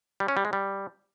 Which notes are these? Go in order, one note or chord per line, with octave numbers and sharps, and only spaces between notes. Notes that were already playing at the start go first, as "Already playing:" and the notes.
G3
C#4
G3
G#3
G3